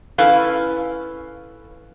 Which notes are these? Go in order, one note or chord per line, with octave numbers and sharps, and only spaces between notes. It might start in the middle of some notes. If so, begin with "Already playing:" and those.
C#4 E4 A4 B4 F5